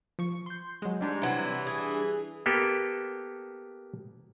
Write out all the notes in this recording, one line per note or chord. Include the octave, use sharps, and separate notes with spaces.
F3 C#6
C6 G6
F#3 G#3
G#2 G3 D4
C3 E3 F#3
G#4
A#3 B3 G4 A4 B4